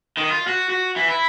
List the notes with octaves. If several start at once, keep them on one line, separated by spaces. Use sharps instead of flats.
D#3
F4
F#4
F#4
E3
E4